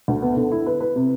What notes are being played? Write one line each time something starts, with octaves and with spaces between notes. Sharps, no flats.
D2
B3
D3
E4
B4
B4
C3